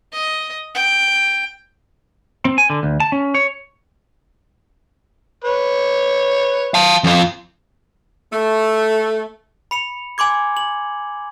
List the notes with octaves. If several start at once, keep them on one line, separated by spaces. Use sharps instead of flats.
D#5
G5
C4
G#5
D3
D2
A5
C#4
C#5
B4 C#5
F5 A5
F2 F4
A3
B5 C#7 F7
G#5 C6 D6 G#6
F#7